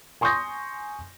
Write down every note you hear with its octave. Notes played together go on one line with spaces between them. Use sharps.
G#5 C6 C#6 D#6 G6 A#6